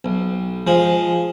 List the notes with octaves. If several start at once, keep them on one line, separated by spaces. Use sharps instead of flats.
B1
F3 G#3